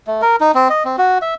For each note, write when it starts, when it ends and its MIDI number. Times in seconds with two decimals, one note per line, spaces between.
0.07 0.22 57
0.22 0.36 70
0.41 0.51 63
0.55 0.68 60
0.70 0.83 75
0.85 0.96 60
0.98 1.18 66
1.22 1.34 76